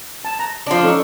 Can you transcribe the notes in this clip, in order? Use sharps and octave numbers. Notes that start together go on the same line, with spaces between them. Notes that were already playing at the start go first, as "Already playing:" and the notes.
A5
A#5
F3 D4
C#4 D#4 A4 C#6